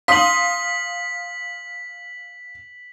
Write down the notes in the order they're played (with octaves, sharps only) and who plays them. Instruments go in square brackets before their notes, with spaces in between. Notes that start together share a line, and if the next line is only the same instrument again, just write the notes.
[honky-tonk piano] F5 C6 D#6 [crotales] B6 F#7